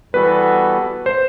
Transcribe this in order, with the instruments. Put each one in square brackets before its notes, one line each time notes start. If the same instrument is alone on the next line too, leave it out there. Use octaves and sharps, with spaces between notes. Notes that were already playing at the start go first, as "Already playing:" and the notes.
[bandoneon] E3 G3 B3 F#4 A4 [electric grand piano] B4
[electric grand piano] C5